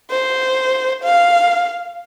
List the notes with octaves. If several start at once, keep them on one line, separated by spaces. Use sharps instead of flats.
C5
F5